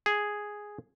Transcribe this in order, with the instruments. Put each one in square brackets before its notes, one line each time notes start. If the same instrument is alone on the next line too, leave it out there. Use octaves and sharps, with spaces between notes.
[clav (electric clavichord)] G#4